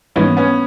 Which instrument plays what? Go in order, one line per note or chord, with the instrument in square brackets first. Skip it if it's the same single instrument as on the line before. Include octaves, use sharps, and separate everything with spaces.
[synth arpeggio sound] G#2 E3 G3 A#3 D#4 [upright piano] B3 C#4
[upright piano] B3 C#4